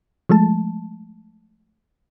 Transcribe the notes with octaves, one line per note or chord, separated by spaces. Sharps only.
F3 G#3 A3 A5